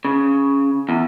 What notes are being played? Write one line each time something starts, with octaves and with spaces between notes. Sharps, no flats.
C#3
E2